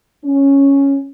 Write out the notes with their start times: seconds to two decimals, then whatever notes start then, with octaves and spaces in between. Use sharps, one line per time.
0.24 C#4